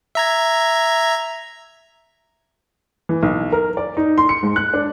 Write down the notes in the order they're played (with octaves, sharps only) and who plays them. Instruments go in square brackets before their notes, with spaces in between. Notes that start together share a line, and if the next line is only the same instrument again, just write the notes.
[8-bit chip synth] E5 A#5 G#6
[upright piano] E3
B1
A#4
D5
D#4
C6
C#7
G#2
F#6
D4